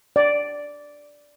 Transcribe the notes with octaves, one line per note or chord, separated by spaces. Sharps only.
D5